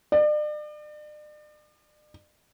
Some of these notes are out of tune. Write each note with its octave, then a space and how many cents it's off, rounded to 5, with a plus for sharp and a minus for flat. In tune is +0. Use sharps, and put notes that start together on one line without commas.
D5 +40